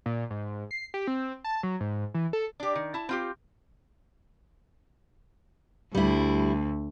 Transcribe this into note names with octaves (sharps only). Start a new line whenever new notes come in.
A#2
G#2
C7
G4
C4
A5
F#3
G#2
E3
A4
D4 G4
D#3
E4 A5
C4 F4 G4
D2 G3 E4